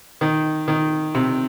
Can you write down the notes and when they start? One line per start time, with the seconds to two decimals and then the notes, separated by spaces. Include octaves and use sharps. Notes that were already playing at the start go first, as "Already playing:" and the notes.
0.21 D#3
0.68 D#3
1.15 C3